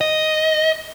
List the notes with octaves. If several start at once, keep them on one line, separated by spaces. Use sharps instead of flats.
D#5